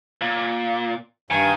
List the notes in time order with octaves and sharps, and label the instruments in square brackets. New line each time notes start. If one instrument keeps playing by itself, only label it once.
[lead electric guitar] A#2
[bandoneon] G2 G#5 [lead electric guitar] D#3